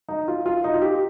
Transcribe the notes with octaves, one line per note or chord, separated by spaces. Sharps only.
D#4
F4
F4
D#4
F4
G4